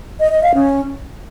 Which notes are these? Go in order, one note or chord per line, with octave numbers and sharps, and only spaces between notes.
D#5
D#5
F5
C#4